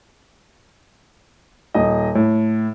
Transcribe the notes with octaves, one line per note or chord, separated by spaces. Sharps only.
D#1 D#5
A2